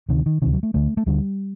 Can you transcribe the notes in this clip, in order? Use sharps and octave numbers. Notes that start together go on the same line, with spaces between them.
D2 C3 D#3
D#3
D2 C3 D#3
F#3
A3
D2 D3 A3
A3
D2 D3 G3